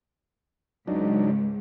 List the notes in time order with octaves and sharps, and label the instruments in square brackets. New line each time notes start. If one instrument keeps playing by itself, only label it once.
[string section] C#2 G#2 [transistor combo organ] F#3 D4 D#4